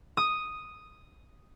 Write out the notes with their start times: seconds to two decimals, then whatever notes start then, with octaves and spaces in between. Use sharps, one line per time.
0.17 D#6